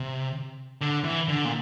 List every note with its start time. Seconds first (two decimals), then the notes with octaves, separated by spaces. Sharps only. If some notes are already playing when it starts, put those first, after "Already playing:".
Already playing: C3
0.81 D3
1.04 E3
1.28 D3
1.45 A#2